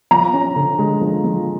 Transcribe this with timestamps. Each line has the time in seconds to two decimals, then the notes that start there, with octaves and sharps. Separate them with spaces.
0.11 F3 A#5
0.33 C#4
0.56 D3
0.79 G#3
1.01 F3
1.24 F3